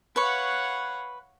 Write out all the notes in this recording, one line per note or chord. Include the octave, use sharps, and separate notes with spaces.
B4 C#5 F5 F#5 C#6